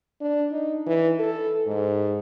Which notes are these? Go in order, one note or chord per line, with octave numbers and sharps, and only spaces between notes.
D4
D#4
E3
A4
G#2